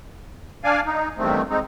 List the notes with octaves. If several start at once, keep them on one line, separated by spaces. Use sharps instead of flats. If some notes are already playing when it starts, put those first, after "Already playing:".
D4 D5 F5 G#5
D#4
E2 G2 D#3 A3 C4
G#3 C4 D#4